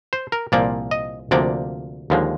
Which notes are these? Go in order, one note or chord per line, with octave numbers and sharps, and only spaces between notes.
C5
A#4
C2 A#2 F3 A#3 D5
D#5
D2 C3 F3 A#3 D5
D#2 D3 F3 G#3